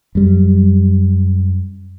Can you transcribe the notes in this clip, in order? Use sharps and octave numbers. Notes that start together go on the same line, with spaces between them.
F#2 G3